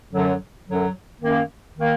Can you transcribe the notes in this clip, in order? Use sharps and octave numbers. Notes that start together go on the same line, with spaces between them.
F#2 D3 F#3
F#2 D3 F#3
F#2 D#3 A#3
D#3 A#3